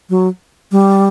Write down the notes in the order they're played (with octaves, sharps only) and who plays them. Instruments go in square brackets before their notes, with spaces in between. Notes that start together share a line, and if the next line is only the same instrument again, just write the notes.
[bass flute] F#3
G3